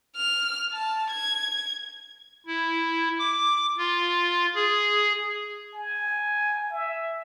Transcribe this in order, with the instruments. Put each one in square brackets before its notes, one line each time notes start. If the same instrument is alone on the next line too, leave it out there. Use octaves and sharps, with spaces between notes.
[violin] F6
A5
G#6
[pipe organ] E4
D6
F4
G#4
[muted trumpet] G#5
E5